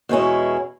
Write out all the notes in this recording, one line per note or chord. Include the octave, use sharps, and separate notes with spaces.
E2 B2 G#3 C#4 E4